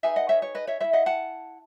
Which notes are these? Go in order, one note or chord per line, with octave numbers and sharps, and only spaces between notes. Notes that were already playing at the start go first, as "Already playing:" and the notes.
D#4 G#4 B4 E5 G#5
D#5 F#5
C#5 E5
C#5
B4 D#5
C#5 E5
E4 A4 C#5 E5
D#5 F#5
F#5 A5